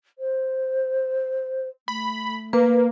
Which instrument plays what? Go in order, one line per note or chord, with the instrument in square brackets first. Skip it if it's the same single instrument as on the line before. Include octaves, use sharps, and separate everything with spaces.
[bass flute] C5
[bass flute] A3 [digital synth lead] B5
[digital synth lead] A#3 [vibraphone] B4